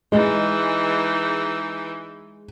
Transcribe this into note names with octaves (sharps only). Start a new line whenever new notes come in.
E3 G#3 D#4